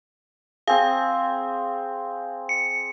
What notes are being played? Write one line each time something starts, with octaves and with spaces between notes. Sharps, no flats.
C4 G#4 F5
C#7